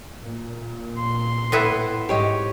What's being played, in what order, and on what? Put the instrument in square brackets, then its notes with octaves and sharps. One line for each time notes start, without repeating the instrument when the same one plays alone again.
[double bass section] A#2
[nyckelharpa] C6
[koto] A2 B3 E4
[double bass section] G#2 [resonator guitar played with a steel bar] G4 C#5 D#5